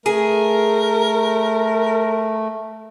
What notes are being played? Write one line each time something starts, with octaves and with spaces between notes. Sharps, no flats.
A3 G#4 A#4